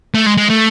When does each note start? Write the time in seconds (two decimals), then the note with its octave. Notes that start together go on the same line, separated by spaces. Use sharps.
0.15 A3
0.26 G#3
0.37 G#3
0.49 A3